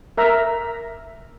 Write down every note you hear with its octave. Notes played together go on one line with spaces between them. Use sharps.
A#4 E5 A#5